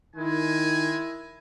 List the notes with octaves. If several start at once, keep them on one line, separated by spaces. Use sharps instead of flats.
D#3 G#3 E4 G#5